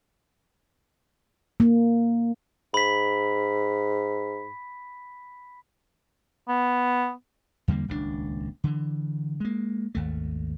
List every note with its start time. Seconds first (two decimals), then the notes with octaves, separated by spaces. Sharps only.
1.60 A#3
2.74 G#2 B5 B6
6.48 B3
7.68 E2 D3 G3 A#3
7.88 D#1 C#2 B2 D4
8.64 D3 E3
9.40 G#3 A#3
9.95 G#1 D#2 A3